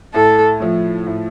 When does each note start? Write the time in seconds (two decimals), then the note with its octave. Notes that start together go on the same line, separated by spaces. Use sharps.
0.14 A2 A4
0.60 F3 A3
1.07 A2